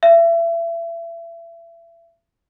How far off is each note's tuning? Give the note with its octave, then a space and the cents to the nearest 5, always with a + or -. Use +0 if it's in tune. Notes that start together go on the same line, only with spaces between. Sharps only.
E5 +30